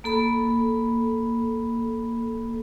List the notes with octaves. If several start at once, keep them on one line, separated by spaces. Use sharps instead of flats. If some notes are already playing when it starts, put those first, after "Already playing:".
A#3 A4 B5